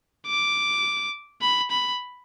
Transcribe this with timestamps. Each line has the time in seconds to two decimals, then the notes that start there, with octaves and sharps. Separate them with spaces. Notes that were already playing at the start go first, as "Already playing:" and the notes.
0.27 D6
1.41 B5
1.71 B5